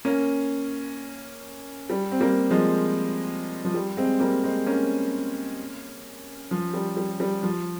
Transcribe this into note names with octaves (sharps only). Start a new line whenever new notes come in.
A#3 C#4
G3
C4
G3 A#3
F3 G#3
F3
G3
G#3 C4
G3 A#3
G#3 C4
A#3 C#4
F3
G3
G3
G3
F3